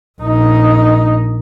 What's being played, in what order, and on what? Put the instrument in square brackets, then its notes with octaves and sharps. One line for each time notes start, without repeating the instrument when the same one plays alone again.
[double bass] A#1 D#4